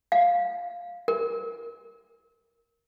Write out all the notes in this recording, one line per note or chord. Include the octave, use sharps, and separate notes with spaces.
F5
A#4